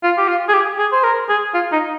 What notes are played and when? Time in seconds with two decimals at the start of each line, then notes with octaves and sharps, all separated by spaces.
0.03 F4
0.18 G4
0.28 F4
0.49 G#4
0.53 G4
0.78 G#4
0.92 C5
1.04 A#4
1.29 G#4
1.54 F4
1.72 D#4